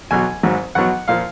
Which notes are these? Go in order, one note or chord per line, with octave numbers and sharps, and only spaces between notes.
B1 B2 F#3 G#5
G#1 G#2 F#3
B1 B2 F#3 F#5
A#2 F3 F5